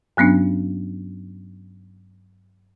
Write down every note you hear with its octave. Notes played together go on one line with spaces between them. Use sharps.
G2 F#3 B3 C#4 D4